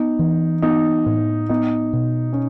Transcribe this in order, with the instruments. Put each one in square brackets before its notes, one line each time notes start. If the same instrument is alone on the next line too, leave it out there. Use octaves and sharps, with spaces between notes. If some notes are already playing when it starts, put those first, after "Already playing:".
Already playing: [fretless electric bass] B3 [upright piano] D#4
[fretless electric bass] E3
[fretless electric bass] B3 [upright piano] D#4
[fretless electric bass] A2
[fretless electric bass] B3 [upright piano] D#4
[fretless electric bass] B2
[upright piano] C#4